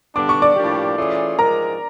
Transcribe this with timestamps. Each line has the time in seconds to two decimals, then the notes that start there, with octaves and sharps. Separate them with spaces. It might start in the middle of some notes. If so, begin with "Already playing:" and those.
0.15 G2 D3 G3 B3 D4 D6
0.29 C#6
0.42 D5 D6
0.56 A2 F3 A#3 D4 G4
0.97 E3 A3 C#4 F4 G#4
1.38 G#2 F3 G#3 A#4 A#5